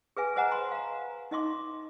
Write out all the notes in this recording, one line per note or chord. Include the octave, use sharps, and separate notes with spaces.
G#4 B4 E5 G#5
B4 C5 D#5 F#5 G#5 A#5
B5 C6
F5 A#5
D#4 D#5 E5 C6 D6